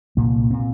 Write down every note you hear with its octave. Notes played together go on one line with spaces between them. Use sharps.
C2 A#2 A#3
A#2 C4